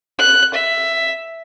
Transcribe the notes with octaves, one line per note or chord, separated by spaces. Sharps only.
F#6
E5